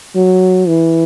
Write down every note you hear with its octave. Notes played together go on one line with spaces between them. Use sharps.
F#3
E3